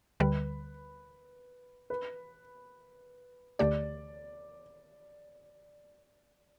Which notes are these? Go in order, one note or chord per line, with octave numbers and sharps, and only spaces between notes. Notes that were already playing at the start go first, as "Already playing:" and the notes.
D2 D3 G3 B4
B4
D2 D3 A3 G4 D5